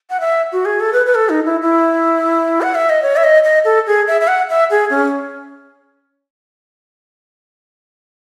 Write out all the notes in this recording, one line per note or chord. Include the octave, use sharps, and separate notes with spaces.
F#5
E5
F#4
G#4
A4
B4
B4
A4
D#4
E4
E4
F#5
E5
D#5
C#5
E5
D#5
D#5
A4
G#4
E5
E5
F#5
E5
G#4
C#4